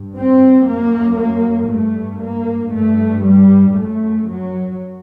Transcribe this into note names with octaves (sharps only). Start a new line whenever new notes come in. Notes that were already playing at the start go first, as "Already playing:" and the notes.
Already playing: G2
C4
F#2 A#3
A#3
G2 A3
A#3
G2 A3
G3
F#2 A3
F#3